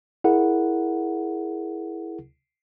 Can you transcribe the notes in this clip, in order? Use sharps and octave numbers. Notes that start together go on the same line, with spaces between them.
E4 G#4 A#4 F#5